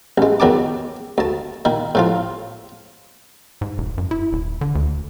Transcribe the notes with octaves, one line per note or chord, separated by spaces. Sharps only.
A1 G#3
E2 D#3 F#3 A5 D6
D2 A5
A#2 D#3
A2 F3 F4
G#2
E1
F#2
E4
D#1
D3
D2